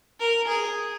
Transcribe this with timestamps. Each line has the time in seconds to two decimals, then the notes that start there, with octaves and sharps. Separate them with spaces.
0.20 A#4
0.48 G#4